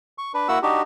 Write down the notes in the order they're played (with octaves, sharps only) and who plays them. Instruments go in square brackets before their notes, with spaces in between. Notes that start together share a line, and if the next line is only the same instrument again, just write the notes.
[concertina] C#6
D4 B4
A#3 E4 F#4 F#5 E6
D4 D#4 F#4 G4